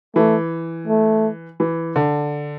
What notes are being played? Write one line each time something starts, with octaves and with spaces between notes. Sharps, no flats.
E3 A3
A3
E3
D3